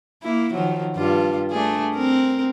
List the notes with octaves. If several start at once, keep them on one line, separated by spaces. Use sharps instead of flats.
A#3 E4
D#3 F3 F#3
G2 F4
A3 D4 G#4
C4 A#4